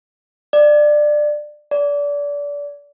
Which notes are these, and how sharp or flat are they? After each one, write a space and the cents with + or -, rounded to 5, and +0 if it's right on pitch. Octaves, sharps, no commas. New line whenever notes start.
D5 +20
D5 -25